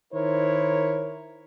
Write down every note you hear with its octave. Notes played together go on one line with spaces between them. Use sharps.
D#3 E4 A#4 C5 C#5